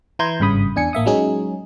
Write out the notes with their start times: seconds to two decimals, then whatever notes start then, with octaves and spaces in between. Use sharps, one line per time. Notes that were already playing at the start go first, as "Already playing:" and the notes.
0.19 E3 E4 A#5 C6 G6 G#6
0.40 G#1 G2 C#3 B5 D#6
0.76 E2 D4 G#5 C#7
0.93 A1 A#3 E5 D#6
1.06 F#3 G#3 C#4 D#4 G#4